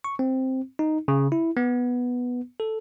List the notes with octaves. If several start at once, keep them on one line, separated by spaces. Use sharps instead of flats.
C#6
C4
D#4
C#3
E4
B3
A4